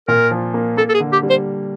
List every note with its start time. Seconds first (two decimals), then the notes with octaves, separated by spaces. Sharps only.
0.08 A#2 A#4
0.31 F3
0.54 A#3
0.77 A#3 A4
0.89 A4
0.94 G#4
1.00 D3
1.12 G4
1.23 G3
1.30 C5